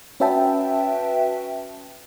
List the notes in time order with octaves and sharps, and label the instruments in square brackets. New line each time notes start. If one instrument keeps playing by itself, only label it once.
[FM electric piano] C#4 F#4 B4 E5 G5 A5